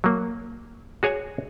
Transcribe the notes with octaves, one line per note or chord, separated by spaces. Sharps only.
F#3 A#3
F#4 G#4 C#5 F#5 G#5